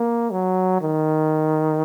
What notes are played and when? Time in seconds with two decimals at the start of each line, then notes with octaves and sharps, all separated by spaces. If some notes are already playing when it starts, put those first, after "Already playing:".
Already playing: A#3
0.31 F#3
0.81 D#3